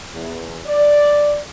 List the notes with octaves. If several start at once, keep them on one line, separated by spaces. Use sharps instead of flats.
E2
D5